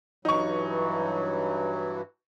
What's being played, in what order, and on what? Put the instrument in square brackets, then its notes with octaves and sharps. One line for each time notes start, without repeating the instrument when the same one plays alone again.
[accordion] G2 E3 F#3 [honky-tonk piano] D#4 C#6